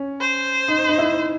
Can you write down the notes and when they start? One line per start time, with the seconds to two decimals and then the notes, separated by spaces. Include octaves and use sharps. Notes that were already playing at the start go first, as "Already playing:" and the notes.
Already playing: C#4
0.20 C5
0.68 D#4
0.89 D#4
0.98 E4